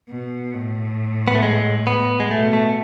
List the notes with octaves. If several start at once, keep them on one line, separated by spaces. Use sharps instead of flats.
B2
A2
B3
A3
G#3
B3
G#3
B2 A3
A3